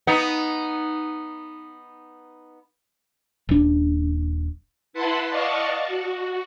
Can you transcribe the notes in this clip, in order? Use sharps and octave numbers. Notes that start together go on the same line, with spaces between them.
B3 D#4
D#1 D4
E4 B4 F#5 A5 B5 C6
D5 D#5 F5 F#5 A5 C#6
F#4